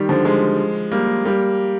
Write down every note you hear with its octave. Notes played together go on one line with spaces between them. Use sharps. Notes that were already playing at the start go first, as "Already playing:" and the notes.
Already playing: D#3 G3
D3 F3
F3 G#3
G3 A#3
G3 A#3